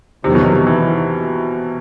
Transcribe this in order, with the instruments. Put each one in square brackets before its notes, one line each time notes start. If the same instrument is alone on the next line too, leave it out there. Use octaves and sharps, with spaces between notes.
[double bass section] E2 D#3 F#3 [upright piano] C3
[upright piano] B2
C3
E3